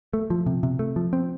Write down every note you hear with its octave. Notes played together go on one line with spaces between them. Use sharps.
A3
F3
C3
C3
A3
F3
C4